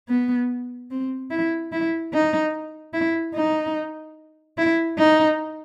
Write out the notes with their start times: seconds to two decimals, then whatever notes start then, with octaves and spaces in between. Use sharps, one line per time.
0.09 B3
0.91 C4
1.31 E4
1.72 E4
2.13 D#4
2.94 E4
3.35 D#4
4.58 E4
4.98 D#4